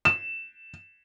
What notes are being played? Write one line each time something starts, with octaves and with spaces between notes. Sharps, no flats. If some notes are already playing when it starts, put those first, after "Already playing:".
E7